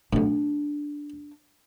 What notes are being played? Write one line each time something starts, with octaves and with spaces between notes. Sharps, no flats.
B1 A2 D4